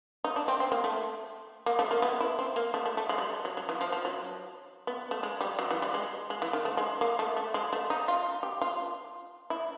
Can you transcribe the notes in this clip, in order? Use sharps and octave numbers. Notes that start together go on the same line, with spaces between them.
D#4
D4
C4
C4
A#3
A3
A#3
A3
A#3
B3
E4
C4
A#3
A3
A3
A3
G#3
G3
F#3
F#3
E3
F3
F3
F#3
B3
A3
G#3
G3
F#3
E3
G3
G#3
G#3
E3
D#3
A3
G#3
A#3
A3
A3
G#3
A3
D#4
F4
G4
F4
E4